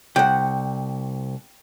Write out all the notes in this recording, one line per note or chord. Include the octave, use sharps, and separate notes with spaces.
C2 F#5 G5 G6